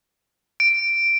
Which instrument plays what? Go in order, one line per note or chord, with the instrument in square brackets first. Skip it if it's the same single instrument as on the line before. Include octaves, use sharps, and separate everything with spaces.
[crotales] D7